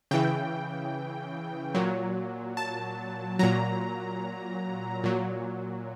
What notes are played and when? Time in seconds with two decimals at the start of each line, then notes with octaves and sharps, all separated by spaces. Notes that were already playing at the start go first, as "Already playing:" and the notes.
0.11 C#3 E3 G5
1.75 A#2 F#3
2.57 A5
3.39 A#2 F#3 A#5
5.04 A#2 F#3